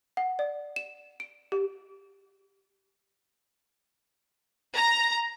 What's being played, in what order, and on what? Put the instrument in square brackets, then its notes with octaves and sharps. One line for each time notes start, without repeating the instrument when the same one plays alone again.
[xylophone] F#5
D5
E7
D7
G4
[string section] A#5